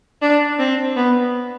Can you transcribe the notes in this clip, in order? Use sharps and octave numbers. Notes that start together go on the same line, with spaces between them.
D4
C4
B3